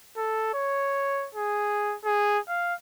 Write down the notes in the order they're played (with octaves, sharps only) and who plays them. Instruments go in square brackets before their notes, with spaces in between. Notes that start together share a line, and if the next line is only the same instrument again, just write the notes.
[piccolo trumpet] A4
C#5
G#4
G#4
F5